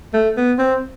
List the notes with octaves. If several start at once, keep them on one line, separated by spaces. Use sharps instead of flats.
A3
B3
C4